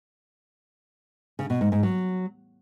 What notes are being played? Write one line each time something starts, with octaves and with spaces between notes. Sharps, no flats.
C#3
B2
G#2
G#2
F#3